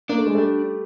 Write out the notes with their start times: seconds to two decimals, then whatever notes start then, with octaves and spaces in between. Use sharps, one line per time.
0.09 A#3 D4
0.18 A3
0.27 G#3
0.35 G3 A3